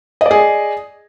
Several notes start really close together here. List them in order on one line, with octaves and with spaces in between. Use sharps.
D#5 D5 G#4